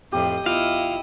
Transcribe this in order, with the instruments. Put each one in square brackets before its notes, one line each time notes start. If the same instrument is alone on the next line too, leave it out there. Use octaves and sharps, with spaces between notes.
[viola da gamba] F2 A2 D#5 [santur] G4
[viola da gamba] E2 E4 D#5 [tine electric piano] F4 [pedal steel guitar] F5